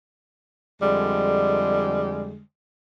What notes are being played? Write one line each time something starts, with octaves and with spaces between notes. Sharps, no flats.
F2 D3 G3 G#3